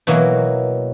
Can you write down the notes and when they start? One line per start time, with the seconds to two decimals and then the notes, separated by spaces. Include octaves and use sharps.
0.07 B2 E3 F#3 A#3